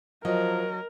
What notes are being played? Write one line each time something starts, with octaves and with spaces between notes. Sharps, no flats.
F3 F#3 A#4 D#5